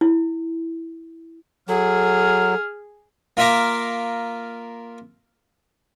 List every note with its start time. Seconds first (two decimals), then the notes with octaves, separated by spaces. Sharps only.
0.01 E4
1.68 F#3 G#4 A4 F6
3.37 A#3 F4 E5 F5 A#5 D6